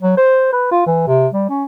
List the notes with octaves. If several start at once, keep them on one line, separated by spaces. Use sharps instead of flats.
F#3
C5
B4
F4
E3
C3
G3
C#4